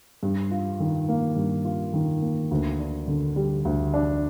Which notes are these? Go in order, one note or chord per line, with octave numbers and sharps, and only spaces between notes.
G2
F4
D#3
A#3
G2
F4
D#3
A#3
D2
D4
D3
G3
D2
D4